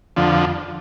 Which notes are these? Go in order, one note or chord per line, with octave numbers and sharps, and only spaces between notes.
F2 D3 F3